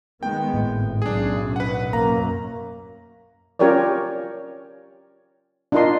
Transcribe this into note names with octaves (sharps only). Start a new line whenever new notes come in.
D#3 G#3 B3 G5
G#1 A2
B1 F#2 D4 G#4
B4 F#5
F#2 A#3 A#5
C#4 F4 G4 A#4 C#5 D5
D4 D#4 F4 A#4 D#5 C6